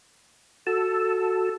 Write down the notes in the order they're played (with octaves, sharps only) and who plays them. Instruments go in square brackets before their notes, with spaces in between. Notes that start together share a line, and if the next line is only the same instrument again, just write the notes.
[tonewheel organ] F#4 A5 E6 [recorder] A4